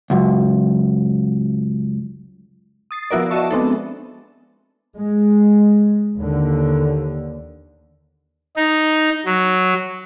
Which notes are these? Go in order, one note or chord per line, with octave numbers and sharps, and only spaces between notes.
C#2 F#2
D#6 A6 C7
F3 B3 E4 F#4 A#4 D5
F#4 D#5 E5 A5 C#6
G#3 B3 C4 D4 D#4 A4
G#3
D#2 D3
D#4
F#3